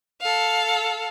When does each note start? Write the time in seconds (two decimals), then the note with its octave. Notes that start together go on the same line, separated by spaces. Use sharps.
0.21 A4 F5